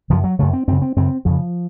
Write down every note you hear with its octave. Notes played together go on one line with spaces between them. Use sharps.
F#2 C#3 F3
F#3
F#2 C#3 A3
C4
F#2 C#3 C4
C4
F#2 C#3 C4
F2 C#3 F3